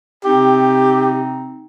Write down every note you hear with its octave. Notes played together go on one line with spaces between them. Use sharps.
C3 C4 D#4 G4